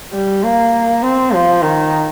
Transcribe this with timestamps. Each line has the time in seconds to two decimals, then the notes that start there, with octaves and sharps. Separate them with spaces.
0.13 G3
0.43 A#3
1.03 C4
1.32 F3
1.62 D#3